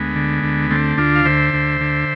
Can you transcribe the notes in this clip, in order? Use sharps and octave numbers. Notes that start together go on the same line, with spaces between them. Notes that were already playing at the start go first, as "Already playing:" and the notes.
Already playing: D2 G#3 B3
D3
D2
D3 A3 C4
D2 D4 F4
F5
D3 C5 E5
D2
D3